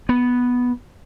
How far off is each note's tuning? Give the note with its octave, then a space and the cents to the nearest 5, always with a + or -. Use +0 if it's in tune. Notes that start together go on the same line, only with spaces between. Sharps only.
B3 -5